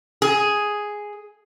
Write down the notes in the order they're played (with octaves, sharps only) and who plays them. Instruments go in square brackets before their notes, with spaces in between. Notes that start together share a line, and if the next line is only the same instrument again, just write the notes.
[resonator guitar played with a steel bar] G#4